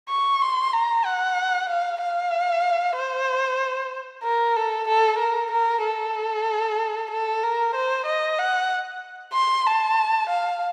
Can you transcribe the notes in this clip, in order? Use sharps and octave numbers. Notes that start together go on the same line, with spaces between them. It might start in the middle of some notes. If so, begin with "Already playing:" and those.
C#6
C6
A#5
F#5
F5
F5
C5
A#4
A4
A4
A#4
A#4
A4
A4
A#4
C5
D#5
F#5
C6
A5
F5